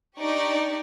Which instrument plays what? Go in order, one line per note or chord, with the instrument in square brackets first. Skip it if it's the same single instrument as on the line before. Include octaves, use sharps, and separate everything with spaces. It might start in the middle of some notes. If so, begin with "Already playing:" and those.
[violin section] D4 D#4 G4 D5 C#6